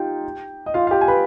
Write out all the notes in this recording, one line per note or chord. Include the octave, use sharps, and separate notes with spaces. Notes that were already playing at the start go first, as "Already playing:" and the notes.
Already playing: D#4 F4 G4 G5
D#5
F4 F5
F5
G4 G5
G#5
B4 B5